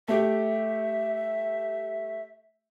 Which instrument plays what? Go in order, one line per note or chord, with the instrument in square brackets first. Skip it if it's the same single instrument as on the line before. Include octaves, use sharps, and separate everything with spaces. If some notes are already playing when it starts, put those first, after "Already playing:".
[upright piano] A3 G4 [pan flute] E5